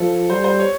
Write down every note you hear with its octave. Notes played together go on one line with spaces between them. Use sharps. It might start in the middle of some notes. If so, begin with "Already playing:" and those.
Already playing: F3 A4
G3 C5
C5
C#5